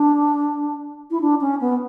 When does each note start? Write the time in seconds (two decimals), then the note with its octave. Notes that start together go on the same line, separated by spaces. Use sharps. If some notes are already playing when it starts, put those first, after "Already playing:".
Already playing: D4
1.10 E4
1.20 D4
1.40 C#4
1.60 B3